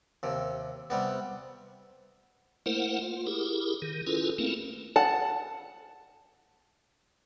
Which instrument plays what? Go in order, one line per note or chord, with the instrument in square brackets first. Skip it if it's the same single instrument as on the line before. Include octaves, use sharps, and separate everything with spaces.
[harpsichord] D#2 C3
C3 G3 B3
[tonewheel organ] A3 A#3 E4 A#4 C5 F#5
F4
E4 G4 G#4 A#4
D#3
C#4 E4 F4 G#4 A4 B4
A3 A#3 C4 C#4 E4 A#4
[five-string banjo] F#5 A5